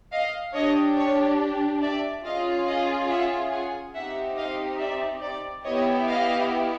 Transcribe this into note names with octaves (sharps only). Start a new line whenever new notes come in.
D#5 F5
D4 G4 C#5 D#5
C#5
D5 E5
C#4 F4 G#4 D#5 F5
D#5 F5
E5 F#5
F#5 G#5
C4 D#4 G4 E5 F#5
D#5 F5
D5 E5
D5
B3 E4 G4 C#5 D#5
D#5 F5